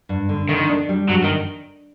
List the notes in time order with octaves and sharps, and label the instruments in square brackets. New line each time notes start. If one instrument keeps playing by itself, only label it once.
[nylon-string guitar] G2
D3
[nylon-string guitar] D3 [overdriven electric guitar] D#3
[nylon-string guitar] D4
G3
[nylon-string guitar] G2 [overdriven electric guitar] F#3
[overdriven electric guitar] D#3